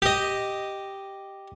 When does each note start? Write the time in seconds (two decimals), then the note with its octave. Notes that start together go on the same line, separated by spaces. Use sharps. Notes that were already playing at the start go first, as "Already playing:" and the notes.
0.02 G4 D#5